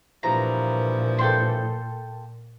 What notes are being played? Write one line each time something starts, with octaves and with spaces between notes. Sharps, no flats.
G2 A#2 E3 F3 A#5
A4 G5 C6